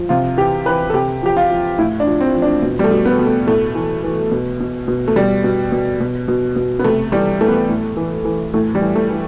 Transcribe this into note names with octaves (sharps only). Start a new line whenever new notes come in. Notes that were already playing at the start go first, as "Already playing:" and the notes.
Already playing: F3
C3 F4
E3 G4
E3 B4
A4
C3 G4
F3 G4
F4
F3
A2 E4
D4
F3
C4
F3
D4
B2
G3
A3
B2
B3
B2
A3
A2 A3
E3
E3
B2
B2
B2
A3
B2 G3
B2
B2
B2
B2
B2
B3
C3 A3
E3 G3
E3 A3
B3
A3
A2
E3
E3
A2 A3
G3
E3
A3
E3